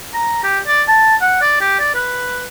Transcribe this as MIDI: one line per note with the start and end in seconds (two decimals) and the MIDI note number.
0.14 0.41 82
0.43 0.58 67
0.67 0.82 74
0.88 1.16 81
1.21 1.41 78
1.42 1.55 74
1.60 1.77 67
1.79 1.92 74
1.95 2.43 71